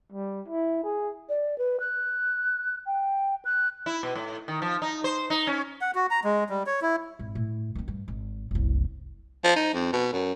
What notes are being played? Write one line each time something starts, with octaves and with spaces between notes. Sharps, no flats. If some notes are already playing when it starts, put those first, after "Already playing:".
G3
E4
G#4
D5
B4
F#6
G5
F#6
E4
B2
A2
D#3
F3
D#4
C5
D#4
C#4
F#5
F#4
A#5
G#3
G3
C#5
E4
G#1
A2
D#3 C4
G2
G#1
F#1 C2
F3
D#4
F2
B2
F#2